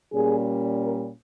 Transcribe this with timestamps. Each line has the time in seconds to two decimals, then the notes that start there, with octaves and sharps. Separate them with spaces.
0.14 A#2 G3 C#4 G#4
0.82 A#4